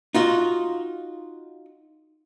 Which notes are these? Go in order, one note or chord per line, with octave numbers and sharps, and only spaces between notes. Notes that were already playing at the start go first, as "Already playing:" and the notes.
D#4 F4 F#4